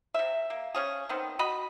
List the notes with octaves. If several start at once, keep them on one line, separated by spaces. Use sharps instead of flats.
C3 E5
A#3
C#3 C#4 G#4
D#3 B3 C4
F#4 D#5 B5